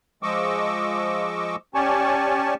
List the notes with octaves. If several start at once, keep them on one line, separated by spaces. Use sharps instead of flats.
F3 G#3 D#5 C#6 D6 E6
C#4 G4 D5 G#5 A5 C#6